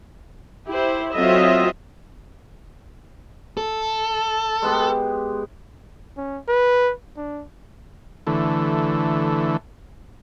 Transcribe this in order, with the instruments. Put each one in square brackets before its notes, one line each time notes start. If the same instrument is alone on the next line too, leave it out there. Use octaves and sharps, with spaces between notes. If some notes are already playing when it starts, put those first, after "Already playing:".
[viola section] E4 G4 C5
F#3 C4 F4 A4 D#5 E5
[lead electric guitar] A4
[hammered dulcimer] G#3 B3 G4
[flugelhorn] C#4
B4
D4
[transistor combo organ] D3 E3 A3